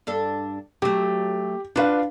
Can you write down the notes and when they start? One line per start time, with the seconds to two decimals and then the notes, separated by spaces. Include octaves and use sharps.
0.07 G2 D4 A4
0.82 F#3 A3 G4
1.76 D4 F4 F#4 B4 F5